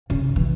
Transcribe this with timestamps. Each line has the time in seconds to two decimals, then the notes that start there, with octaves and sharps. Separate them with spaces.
0.10 C#3
0.36 E3